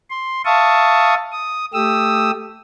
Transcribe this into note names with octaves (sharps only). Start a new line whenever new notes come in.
C6
E5 F5 A5 C#6 D#6
D#6
A3 G4 D#6 E6